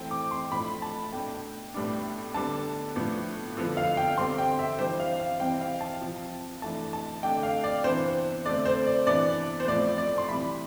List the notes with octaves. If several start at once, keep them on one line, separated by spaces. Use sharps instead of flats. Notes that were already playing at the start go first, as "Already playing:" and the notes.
Already playing: E3 A3 C4 G5
D6
C6
A2 F3 A3 D4 B5
A5
B2 A3 D4 G5
A2 G3 B3 D4
D3 G3 B3 D4 A5
A2 F3 B3 D4
D3 F3 B3
F5
G5
D3 G3 C4 C6
G5
E5
E3 G3 D4 C5
F5
F5
C3 E3 G3 C4 G5
F5
A5
C3 F3 C4
E3 A3 D4 A5
A5
D3 A3 D4 G5
F5
D5
C3 E3 B3 D4 C5
D3 A3 C4 D5
C5
D5
C3 E3 B3 D4 D5
C5
A2 F3 C4 D5
D5
C6
C3 E3 G3 B5